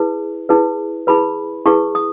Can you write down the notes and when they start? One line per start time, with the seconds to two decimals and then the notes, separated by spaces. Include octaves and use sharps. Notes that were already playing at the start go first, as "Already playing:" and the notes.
Already playing: E4 G#4 B4
0.49 E4 G#4 B4
1.07 E4 G#4 B4 B5
1.66 E4 G#4 B4 C#6
1.95 D#6